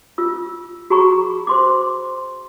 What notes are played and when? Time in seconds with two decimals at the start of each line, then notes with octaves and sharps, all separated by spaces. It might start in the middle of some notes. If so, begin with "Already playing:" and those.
0.18 F4 E6
0.90 F#4 G#4 A#5 B5 C#6
1.47 C5 C6 D6